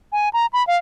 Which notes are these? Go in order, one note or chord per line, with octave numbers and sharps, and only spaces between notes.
G#5
A#5
B5
F5